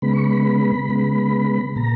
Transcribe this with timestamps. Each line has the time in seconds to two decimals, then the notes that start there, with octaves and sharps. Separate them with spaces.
0.02 C#3 G#3 B3 B5
0.13 C#6
0.24 B5
0.89 C#3 G#3 B3
1.76 A#2 A#5